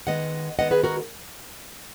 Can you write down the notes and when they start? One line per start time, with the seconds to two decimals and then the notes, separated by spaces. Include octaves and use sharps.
0.07 D#3 G#3 B3 D#5 F#5
0.58 D#3 G#3 B3 D#5 F#5
0.71 G#4 B4
0.84 F#4 A#4